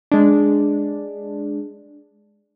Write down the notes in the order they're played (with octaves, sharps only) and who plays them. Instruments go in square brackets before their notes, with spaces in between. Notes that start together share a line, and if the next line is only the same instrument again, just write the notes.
[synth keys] G#3 D4